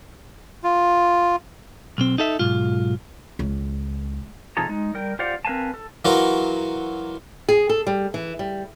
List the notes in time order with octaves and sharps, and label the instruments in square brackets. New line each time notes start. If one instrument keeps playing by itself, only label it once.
[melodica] F4
[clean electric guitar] B1 C4
D#4 A4 E5
B1 G#2 F4
[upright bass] C#2
[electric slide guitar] C3 F3 D#4 G#4 A4 A#5
G#3 D#4
G3 A#4 G5
F4 G4 C5 D5 F5 F#5
C4 A#4 B4 F5 G#5 A5
A4
[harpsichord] E3 F#3 F4 F#4 A#4
[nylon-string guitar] G#4
A4
G3
E3
G3